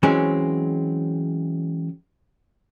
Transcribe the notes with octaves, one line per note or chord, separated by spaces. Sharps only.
E3 F#3 G#3 C4 C#4